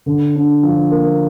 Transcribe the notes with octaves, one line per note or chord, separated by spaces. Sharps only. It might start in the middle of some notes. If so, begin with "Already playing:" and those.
D3
D4
F3
A#3